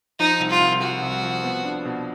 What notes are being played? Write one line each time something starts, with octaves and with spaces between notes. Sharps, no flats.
F3 D#4
C2
F4
C2
F3 F#4
C2
F3
B3
D4
B2